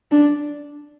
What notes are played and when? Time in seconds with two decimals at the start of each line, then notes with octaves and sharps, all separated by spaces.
0.11 D4